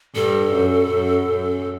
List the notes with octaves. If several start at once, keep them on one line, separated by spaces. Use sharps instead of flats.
G2 A4
F#2
F#2
F#2